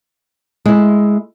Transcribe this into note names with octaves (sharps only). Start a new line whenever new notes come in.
G#3 E4